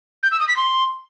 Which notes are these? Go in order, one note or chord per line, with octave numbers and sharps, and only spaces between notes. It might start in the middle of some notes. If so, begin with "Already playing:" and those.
G6
E6
D#6
B6
C6